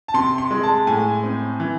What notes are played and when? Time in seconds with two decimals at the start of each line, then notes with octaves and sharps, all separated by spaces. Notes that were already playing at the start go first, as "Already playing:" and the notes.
0.08 A5
0.14 C3 C6
0.38 C6
0.51 G#3
0.63 A5
0.87 A2 G#5
1.23 C4
1.60 E3